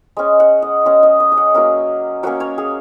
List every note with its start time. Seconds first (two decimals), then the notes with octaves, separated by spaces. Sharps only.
0.17 G#3 C#4 D#5
0.40 F#5
0.62 D#5
0.86 G#3 C#4 D#5
1.03 D#5
1.20 D#5
1.32 D#5
1.37 F#5
1.54 F#3 A#3 C#4
2.23 F#3 A#3 C#4 F#5
2.40 C#5
2.58 G#4